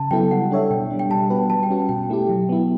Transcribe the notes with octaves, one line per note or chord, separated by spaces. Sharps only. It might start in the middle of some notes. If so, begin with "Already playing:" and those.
Already playing: C#3 A5
F#3 B3 E4 A4 G5
G3 F#5
D4 A4 C#5 E5
B2 G5
G3 D4
G5
G3 A5
B3 F#4 B4
G3 A5
G5
C#4 F#4
B2 G5
A3 E4 G4
F#3
B3 E4